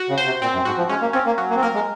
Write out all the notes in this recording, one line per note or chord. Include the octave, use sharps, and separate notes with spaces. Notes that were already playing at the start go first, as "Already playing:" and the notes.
Already playing: F#4
C#3
C5
C3
A#2 C4
F#2
G#2 F#4
F3
G#3 C#4
A#3
C4 C#4
A#3
F#3
A#3
C4
A#3 A#4
G#3